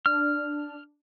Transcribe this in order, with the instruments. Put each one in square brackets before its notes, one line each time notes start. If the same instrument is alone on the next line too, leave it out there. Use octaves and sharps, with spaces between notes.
[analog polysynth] D4 [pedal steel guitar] F6